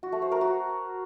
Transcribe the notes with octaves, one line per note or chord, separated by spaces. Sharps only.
F#4
A3
C5
A#4
F#4